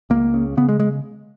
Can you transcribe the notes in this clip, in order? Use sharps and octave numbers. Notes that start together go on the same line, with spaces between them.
C#2 A#3
C#3
C#3 B3
G#3
G#3